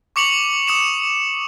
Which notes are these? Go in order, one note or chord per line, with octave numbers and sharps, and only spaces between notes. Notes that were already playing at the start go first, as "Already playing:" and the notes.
C#6 D6 C#7 F7 F#7
D#6 C#7 E7